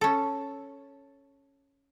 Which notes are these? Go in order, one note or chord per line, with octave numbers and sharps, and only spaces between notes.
C#4 A4